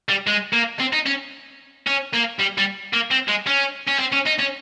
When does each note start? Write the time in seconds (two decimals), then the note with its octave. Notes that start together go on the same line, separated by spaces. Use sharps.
0.09 G3
0.27 G#3
0.53 A#3
0.80 C4
0.93 D#4
1.06 C#4
1.87 C#4
2.14 A#3
2.40 G3
2.58 G3
2.93 A#3
3.11 C4
3.28 G#3
3.47 C#4
3.88 C#4
3.99 C4
4.13 C#4
4.27 D#4
4.40 C#4